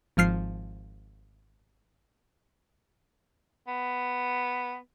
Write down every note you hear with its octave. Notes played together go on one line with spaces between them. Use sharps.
G#1 F3 F6 C7
B3